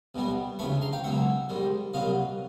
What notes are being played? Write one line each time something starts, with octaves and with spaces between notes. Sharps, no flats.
B1 B2 G3 B3
D2 C#3 E3 A3 B5 C#6
A#5 C6
F5 G5
C#2 B2 F#3 E5 F#5
G#2 D#3 G3
C2 A#2 F#3 B3 D#5 F5